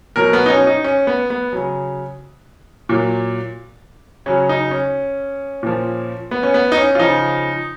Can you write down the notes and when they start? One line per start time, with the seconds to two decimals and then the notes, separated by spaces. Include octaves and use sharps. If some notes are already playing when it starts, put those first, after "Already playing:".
0.16 B2 F#3 A#4
0.33 B3
0.46 D#4
0.50 C#4
0.67 D#4
0.84 C#4
1.07 B3
1.30 B3
1.53 C#3 F#3
2.89 A#2 F#3
4.26 C#3 F#3 C#4
4.49 D#4
4.71 C#4
5.63 A#2 F3
6.31 B3
6.43 C#4
6.54 B3
6.72 D#4
6.77 C#4
6.95 F4
6.99 C#3 F3 D#4